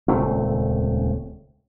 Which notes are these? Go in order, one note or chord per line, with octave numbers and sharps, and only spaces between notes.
D#1 C#2 A3 C4